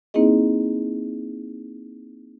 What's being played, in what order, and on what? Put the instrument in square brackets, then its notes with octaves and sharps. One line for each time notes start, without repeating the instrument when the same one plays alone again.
[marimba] A#3 C4 D#4 E4 G#4 D#5